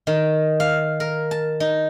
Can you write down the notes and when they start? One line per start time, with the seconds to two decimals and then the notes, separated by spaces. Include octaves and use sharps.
0.07 D#3
0.60 F5
1.00 A#4
1.31 A5
1.60 D#4